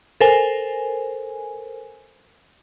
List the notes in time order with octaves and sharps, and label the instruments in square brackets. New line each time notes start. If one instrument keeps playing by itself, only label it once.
[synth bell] A4 A#4 C5 G#5